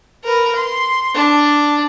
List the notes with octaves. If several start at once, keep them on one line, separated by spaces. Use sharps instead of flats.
A#4 B4
C6
D4